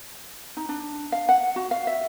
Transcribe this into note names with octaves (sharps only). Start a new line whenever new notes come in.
D#4
D4
F5
F#5
F#4
F5
E5